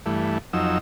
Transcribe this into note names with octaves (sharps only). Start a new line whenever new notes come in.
G2 E3 A3
F2 F#3 D#4 E6